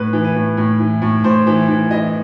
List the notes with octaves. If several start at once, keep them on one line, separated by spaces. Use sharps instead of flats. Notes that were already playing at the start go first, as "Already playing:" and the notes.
Already playing: A2 B4
E3
B4
A2
A2
E3
A2
A2 C5
E3
E3
E3 D#5